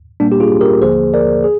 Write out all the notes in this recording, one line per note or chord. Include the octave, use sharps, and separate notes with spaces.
A#2 G3 A#3 D4
G4
F4 G#4
G4 A#4
D#2 D3 F3 A#3 G#4 C5
A#4 D5
G#4